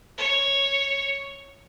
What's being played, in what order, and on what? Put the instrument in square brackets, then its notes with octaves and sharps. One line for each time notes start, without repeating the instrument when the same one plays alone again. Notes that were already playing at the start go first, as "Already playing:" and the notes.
[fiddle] C#5